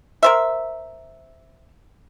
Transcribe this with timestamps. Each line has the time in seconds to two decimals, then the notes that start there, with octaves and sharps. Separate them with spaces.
0.23 A#4 C5 E5